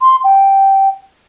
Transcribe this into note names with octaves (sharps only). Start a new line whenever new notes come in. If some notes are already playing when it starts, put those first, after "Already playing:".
C6
G5